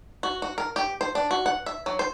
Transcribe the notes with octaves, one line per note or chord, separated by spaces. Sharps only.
F#4
F#4
A#4
G4
C5
D4
F#4
F#5
E5
F#3
C5